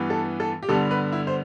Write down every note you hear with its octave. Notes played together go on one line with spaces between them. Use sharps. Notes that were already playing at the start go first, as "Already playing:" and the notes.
Already playing: G2 E3 B3
A4
A4
G4
G2 D3 G3 B3 A4
B4
E4
C5